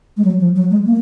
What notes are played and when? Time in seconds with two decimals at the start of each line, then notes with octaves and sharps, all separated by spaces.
0.17 G#3
0.24 F#3
0.40 F3
0.56 F#3
0.71 G#3
0.86 A#3